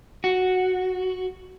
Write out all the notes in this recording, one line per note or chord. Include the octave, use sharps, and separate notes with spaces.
F#4